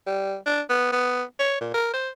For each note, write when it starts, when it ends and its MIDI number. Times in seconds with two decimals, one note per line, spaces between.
0.07 0.36 55
0.46 0.61 62
0.69 0.91 59
0.92 1.23 59
1.39 1.57 73
1.60 1.72 46
1.74 1.89 70
1.93 2.09 72